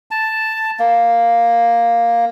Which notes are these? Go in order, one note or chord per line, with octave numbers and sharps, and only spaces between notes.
A5
A#3